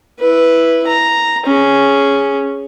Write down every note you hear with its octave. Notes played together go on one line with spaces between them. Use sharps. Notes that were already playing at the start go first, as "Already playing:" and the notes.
E4 B4
A#5
C#4 G#4